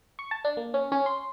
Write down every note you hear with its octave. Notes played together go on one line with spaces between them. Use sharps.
C#6
A5
D4
A#3
C#4
C#4
C6